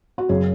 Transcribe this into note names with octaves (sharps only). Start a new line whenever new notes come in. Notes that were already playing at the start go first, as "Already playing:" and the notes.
F#4
F#2 C#3 F#3 G#4